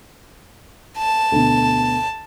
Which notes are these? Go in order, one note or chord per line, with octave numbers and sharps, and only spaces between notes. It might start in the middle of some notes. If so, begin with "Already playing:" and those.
A5
D2 B2